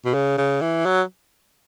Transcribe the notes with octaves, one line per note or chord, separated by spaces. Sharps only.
B2
C#3
C#3
E3
F#3